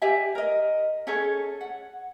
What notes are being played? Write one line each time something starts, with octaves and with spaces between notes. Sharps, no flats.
G4 D5 E5 G#5
A#4 D#5
C#4 G#4 A4 C#5
F#5